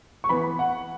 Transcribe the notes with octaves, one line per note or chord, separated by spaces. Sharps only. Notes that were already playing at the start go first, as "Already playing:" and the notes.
C#6
E3 B3 B5
F#5